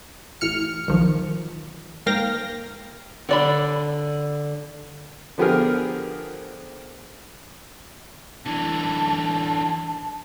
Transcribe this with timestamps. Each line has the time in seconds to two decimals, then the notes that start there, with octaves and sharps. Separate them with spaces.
0.41 A1 A2 F6 C#7
0.88 B1 E2 D#3 F3
2.06 G#2 A#3 A#4 F5 G5 A#6
3.29 D3 D5 B5
5.38 D3 F3 B3 G4 G#4 A#4
8.46 D3 E3 A5